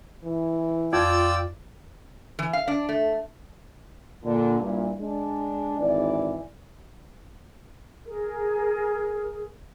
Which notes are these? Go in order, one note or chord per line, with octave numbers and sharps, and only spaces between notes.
E3
F2 F4 D5 G5 E6
E3
F5
D4
A3
A#2 D3
G2 A#2 E3
G#3 D4
G#1 E3 D5
G#4 A#4